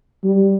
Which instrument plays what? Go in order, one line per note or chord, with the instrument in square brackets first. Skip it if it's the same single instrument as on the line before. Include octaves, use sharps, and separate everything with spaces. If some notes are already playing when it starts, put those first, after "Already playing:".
[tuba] G3